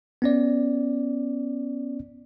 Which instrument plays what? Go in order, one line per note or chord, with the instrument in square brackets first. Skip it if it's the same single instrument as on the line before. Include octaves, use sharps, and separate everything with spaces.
[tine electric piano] B3 C#4 D5